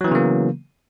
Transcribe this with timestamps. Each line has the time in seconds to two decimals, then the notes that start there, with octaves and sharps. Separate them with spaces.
0.01 F#3
0.04 E3
0.08 B3
0.11 C#3
0.15 A#3